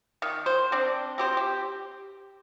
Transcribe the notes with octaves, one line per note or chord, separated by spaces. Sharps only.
D#3
C5
C4 D4
C4 G4 C5
G4